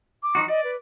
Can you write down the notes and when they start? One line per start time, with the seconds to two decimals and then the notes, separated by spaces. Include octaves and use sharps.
0.23 D6
0.35 F3 D#4 F#4
0.48 D5 D#5
0.64 B4